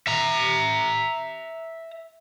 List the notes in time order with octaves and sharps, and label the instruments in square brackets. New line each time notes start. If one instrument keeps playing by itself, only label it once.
[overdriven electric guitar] E5 A#5